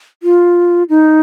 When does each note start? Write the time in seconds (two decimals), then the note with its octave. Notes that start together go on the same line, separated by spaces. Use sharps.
0.23 F4
0.89 D#4